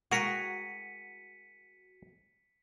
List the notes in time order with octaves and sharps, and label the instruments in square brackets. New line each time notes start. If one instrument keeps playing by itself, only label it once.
[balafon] G#3 [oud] F#4 [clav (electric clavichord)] G#4 A#4 A#5 [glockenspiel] B6 C#7 D#7